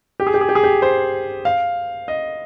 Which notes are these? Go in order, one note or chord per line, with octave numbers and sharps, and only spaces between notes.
G4
G#4
G4
G#4
G4
G#4
G4
C5
F5
D#5